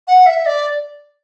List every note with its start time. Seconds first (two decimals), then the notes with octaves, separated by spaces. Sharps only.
0.08 F#5
0.26 E5
0.46 D5